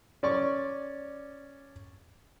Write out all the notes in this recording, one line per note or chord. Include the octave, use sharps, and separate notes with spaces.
C#4 D5 C#6